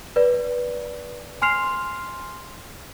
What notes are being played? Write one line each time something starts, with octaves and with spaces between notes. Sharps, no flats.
B4 D5
G#5 C6 F6 C7 F7